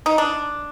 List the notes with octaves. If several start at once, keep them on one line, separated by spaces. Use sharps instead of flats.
D#4
D4